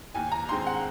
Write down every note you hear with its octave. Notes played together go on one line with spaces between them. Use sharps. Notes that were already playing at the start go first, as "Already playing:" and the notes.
D#2 G#5
A#5
D#3 G#3 C4 C6
F#5